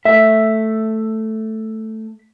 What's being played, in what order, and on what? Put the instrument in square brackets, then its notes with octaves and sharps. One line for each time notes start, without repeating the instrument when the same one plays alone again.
[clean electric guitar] A3 [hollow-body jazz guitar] E5